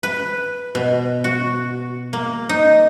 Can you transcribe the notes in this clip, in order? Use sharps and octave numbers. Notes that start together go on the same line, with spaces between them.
B4
B2
F#4
A#3
D#4